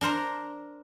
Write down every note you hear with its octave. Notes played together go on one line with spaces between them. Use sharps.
D4 A#4 C5 A#5